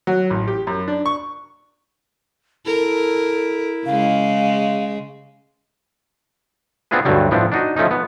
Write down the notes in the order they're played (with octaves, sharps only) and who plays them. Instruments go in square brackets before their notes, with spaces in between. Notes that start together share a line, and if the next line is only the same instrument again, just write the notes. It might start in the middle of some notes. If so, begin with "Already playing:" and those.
[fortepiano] F#3
A1
G4
F#2
D4
C#6
[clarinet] E4 [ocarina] A4 [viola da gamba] A#4
[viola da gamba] C#3 G#3 [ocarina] F5
[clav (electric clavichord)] B3 C4 D4 F4 G#4 B4
D2 G2 D3 F#3 G3
A2 F3 B3 C4 D4
D4 D#4 F#4 D#5
F3 A3 C#4 D#4
B3